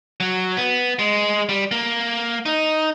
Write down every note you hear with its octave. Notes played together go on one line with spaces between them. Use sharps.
F#3
B3
G#3
G3
A#3
D#4